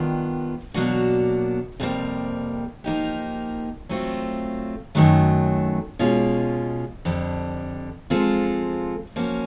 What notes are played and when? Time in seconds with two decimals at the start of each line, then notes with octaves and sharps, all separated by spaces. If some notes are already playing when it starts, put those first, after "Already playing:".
Already playing: D#3 G3 B3 D4 F4
0.74 B2 F#3 A#3 D4 F#4
1.80 F2 C3 E3 G3 A#3
2.84 F3 A#3 D#4 G4
3.89 F#3 A3 C4 F4
4.95 F#2 D#3 F#3 A3
5.99 B2 G#3 C#4 F4
7.05 F2 D3 G3
8.10 F3 G#3 C4 F4 A4
9.16 F3 A#3 C#4 F#4